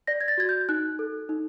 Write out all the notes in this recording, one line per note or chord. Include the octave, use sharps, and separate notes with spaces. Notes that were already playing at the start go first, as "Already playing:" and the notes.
D5 A#6
G#6
A6
F#4 G#6
G6
D#4 F#6
A4
D#4